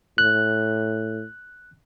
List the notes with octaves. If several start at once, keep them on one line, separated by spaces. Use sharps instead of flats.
A2 F#6